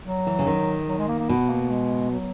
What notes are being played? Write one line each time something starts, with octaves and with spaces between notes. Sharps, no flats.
F#3
E3
C#3
D#3
F#3
G#3
A#3
A#3
B2 B3
A#3
G#3
F#3